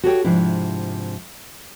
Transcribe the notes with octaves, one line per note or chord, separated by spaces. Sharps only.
F#4 G4 A4 B4 C#5 G5
G#2 C3 F3 D4 E4